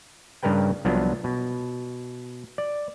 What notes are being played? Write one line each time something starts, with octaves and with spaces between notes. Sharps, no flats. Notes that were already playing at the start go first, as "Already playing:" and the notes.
G2 C#3 G3 A#4 B4 G5
C2 F3 F#3 B3 D4
B2
D5